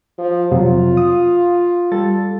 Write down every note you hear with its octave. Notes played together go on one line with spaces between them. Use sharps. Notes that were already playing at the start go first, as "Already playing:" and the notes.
F3
F2 C3 F#3 F4
D#6
G3 A4 A6